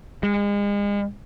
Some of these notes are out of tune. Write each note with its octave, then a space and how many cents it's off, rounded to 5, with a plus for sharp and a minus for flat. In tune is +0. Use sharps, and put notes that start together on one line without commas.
G#3 -35